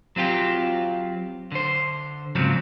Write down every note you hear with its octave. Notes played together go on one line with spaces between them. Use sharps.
F#3 C4 F4 G4
D3 C5
G#2 C#3 F3 F#3 C4